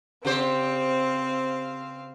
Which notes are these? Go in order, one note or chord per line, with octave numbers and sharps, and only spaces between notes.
C#3 C4 G4 C5 F5